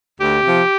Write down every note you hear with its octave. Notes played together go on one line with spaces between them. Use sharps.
D2 G4
C3 F3